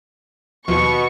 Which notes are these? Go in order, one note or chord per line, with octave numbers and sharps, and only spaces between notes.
D#2 B2 F3 C#6